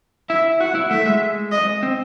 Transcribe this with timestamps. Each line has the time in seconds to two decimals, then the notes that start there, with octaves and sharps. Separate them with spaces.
0.29 E4 E5
0.60 F#4 F#5
0.75 E4
0.91 A3 E5
1.06 G#3
1.52 D#5
1.83 C4